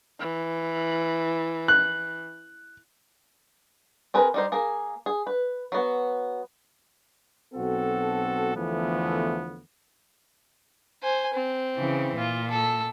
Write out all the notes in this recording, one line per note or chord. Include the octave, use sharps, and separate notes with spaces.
E3
F#6
C4 G#4 A#4 B4
G3 D#4 C5
A#3 G#4
G#4
B4
F#3 B3
B1 C4 F#4 A4
E2 D3 E3 F3 A3 B3
C5 G#5
C4
C#3 E3
A#2 F4
A4 E6